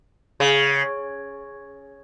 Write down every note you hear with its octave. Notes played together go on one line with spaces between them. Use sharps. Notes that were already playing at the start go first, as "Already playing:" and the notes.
C#3